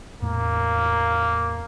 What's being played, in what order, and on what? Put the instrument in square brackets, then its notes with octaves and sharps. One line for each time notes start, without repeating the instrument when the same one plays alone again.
[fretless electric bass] E2 A2 A3 [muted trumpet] A#3